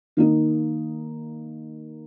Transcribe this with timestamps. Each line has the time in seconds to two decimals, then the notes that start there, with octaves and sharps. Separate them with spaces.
0.17 D#3 A#3 D#4